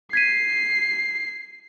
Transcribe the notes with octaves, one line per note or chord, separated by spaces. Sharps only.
G#6 B6 C7 D#7